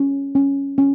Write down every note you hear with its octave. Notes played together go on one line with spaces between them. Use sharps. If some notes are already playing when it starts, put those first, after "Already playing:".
Already playing: C#4
C#4
C#4